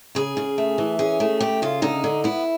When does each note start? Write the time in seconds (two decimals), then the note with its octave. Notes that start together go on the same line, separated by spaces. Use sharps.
0.15 C#3 G#4
0.37 C#3
0.58 A3
0.78 E3
0.99 C#4 G#4
1.20 A3
1.41 C#3 G4
1.62 C#3 F4
1.82 D3 D#4
2.04 D3
2.24 B3 E4